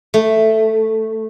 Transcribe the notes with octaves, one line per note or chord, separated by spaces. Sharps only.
A3